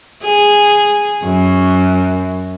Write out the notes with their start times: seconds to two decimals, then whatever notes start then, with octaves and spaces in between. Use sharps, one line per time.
0.23 G#4
1.24 F#2